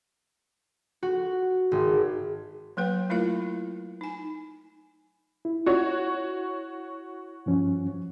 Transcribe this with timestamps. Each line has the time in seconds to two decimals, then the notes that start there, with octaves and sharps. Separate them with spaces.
1.03 F#4
1.72 G#1
2.77 F#3 A#3 B4 G5
3.10 A3 E4 F4 A#4 F5
4.01 D#4 G#5
5.45 E4
5.66 F#4 C#5
7.46 G2 F3 C#4